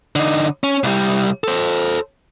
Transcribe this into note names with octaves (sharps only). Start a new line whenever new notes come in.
D3 D#4
C#4
C2 G3
A4 C5